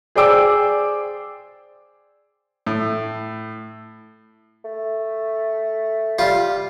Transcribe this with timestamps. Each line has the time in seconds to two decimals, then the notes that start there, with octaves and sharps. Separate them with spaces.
0.16 G#4 C5 D5 G5 D6 E6
2.67 A2
4.65 A3
6.19 G3 F4